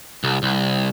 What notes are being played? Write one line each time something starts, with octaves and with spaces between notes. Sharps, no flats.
C2
C2